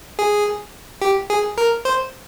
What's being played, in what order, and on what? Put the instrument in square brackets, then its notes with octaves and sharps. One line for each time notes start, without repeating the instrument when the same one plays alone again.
[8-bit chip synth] G#4
G4
G#4
A#4
C5